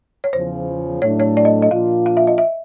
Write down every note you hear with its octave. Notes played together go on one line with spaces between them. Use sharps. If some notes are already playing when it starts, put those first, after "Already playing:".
C#5
E2 C#3 F3 C5
A2 F#3 A3 D4 C#5
C#5
D5
D#5
D#5
A#2 F3 A#3 D4 F4 F5
F5
E5
D#5
E5